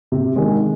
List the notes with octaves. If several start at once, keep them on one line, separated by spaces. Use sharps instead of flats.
C3
D#3 G#3